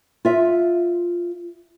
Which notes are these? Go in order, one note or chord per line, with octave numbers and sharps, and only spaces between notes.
F4 E5